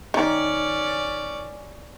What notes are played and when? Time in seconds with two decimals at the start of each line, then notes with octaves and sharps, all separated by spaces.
0.14 D#3 C#4 D5